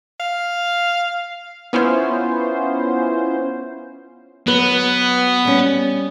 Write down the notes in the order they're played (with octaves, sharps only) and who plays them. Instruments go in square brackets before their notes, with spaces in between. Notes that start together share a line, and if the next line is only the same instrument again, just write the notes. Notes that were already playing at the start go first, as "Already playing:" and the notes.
[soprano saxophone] F5
[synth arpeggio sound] B3 C#4 E4 F4 C5
[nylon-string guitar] F#3 B4 [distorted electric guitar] B3
[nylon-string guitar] G3 C#4